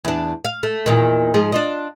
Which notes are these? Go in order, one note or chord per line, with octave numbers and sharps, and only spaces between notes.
E2 D4
F5
A3
E2 A#2 D#3
G#2 F3 G#4
D4 F4 D#5